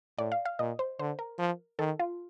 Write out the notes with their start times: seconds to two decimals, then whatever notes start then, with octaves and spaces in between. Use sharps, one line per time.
0.18 A2 D5
0.32 F5
0.45 F5
0.59 A#2 D#5
0.79 C5
0.99 D3 C5
1.19 A#4
1.39 F3
1.79 D#3 A4
1.99 F4